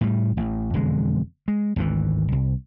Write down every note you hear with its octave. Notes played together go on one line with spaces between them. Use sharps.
A2 G3
A1
E1 F2 D3 G#3
G#3
G#1 D2 B2 E3
C2